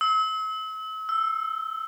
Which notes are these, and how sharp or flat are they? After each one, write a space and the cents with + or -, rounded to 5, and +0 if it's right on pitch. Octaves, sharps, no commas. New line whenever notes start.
E6 -40
E6 +5